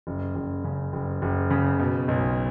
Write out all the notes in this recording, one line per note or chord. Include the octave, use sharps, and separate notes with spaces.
F#1
F#1
C#3
F#1
F#1
C#3
B2
B1